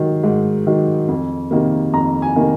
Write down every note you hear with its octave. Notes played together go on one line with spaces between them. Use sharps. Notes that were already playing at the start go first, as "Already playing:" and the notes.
Already playing: G#2 D#3 F#3
G#2
D#3 F#3
F2
C3 D#3 A#3
F2 A#5
G#5
C3 D#3 A#3